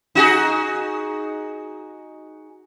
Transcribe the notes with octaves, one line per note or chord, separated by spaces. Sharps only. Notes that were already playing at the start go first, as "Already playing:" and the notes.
D#4 F#4 G#4